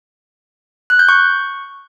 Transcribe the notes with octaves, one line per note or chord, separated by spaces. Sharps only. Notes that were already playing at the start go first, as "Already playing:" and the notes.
F#6
G6
C#6